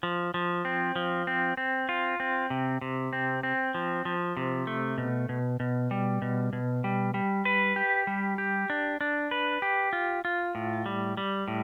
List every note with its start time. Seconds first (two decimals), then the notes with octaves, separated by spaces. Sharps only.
0.03 F3
0.34 F3
0.65 C4
0.96 F3
1.27 C4
1.57 C4
1.89 F4
2.20 C4
2.50 C3
2.81 C3
3.13 C4
3.43 C4
3.74 F3
4.05 F3
4.37 C3
4.67 A3
4.98 B2
5.29 B2
5.60 B2
5.91 G3
6.22 B2
6.53 B2
6.84 G3
7.14 G3
7.45 B4
7.76 G4
8.07 G3
8.38 G4
8.70 D4
9.01 D4
9.31 B4
9.62 G4
9.93 F4
10.25 F4
10.55 A2
10.86 G3
11.17 G3
11.48 A2